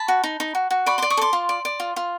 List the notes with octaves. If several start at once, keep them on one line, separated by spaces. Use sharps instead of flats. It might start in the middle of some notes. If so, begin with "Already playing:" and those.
Already playing: A5 B5
F#4
D#4
D#4
F#4
F#4
D5 B5 C#6
D5 C6 D6
C#6 D#6
A4 C6 D6
F4
D5
D5
F4
F4